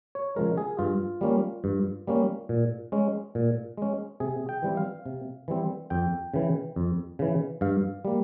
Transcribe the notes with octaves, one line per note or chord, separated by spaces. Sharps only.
C#5
C#3 F3 G#3 A#4
G#4
G2 F4
G3 A#3 C#4
G2
G3 A#3 C#4
A#2
G#3 C#4
A#2
G#3 C#4
C3 G#4
G5
E3 G3 C4
F5
C3
E3 G3 C4
F2 G5
C#3 E3
F2
C#3 E3
G2 F5
G3 A#3